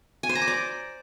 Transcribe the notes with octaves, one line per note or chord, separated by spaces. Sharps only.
G#5
C5
A#5
D6
D5